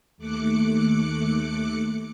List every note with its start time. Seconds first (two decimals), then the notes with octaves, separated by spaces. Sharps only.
0.18 D#2 A3 D6 F#6 C#7